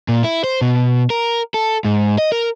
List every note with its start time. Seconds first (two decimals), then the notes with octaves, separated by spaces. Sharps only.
0.08 A#2
0.24 E4
0.44 C5
0.61 B2
1.10 A#4
1.54 A4
1.85 G#2
2.18 D#5
2.32 A#4